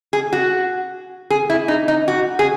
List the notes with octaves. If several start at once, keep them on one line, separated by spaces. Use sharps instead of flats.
G#4
F#4
G#4
E4
D#4
D#4
F#4
G#4